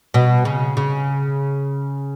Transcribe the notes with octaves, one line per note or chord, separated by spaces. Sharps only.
B2
C#3
C#3